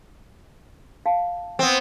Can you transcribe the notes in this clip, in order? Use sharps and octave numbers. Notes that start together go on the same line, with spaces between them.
F5 A5
B3 C4